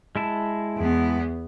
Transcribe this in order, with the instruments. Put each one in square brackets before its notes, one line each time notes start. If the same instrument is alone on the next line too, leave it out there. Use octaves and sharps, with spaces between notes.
[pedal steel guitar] G#3 E4 A5
[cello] E2 B3